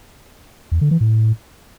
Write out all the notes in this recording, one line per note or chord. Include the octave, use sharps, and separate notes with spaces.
E2
D3
E3
A2